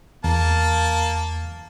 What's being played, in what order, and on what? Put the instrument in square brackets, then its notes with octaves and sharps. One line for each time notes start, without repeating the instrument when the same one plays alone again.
[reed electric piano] E2 [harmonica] A#3 A5